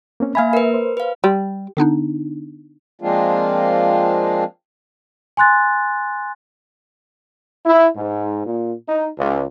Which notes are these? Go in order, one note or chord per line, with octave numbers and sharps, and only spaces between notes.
A#3 C4 C#4
A#3 E5 F5 G#5 B5
A#4 B4
C5
B4 F5
G3
D3 B3 D4 D#4
F3 G#3 A#3 C4 D4 F4
G#5 C6 F#6 A6
E4
G#2
A#2
D#4
C#2